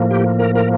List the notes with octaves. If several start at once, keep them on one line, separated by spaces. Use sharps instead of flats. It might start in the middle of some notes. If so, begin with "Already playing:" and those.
Already playing: A2 F3 A#3
G4
A#4
A#4